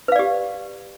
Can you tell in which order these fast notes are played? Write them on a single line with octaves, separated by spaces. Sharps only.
B4 F5 D5 G4